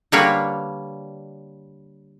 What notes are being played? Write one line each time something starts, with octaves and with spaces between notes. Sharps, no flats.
D3 G3 A#3 B4 C#5